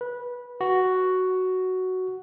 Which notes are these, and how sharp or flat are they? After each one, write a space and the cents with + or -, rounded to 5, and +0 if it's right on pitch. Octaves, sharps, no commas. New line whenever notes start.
B4 -15
F#4 +5